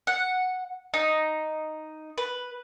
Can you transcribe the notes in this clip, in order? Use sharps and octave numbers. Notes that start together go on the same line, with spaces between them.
F#5
D#4
B4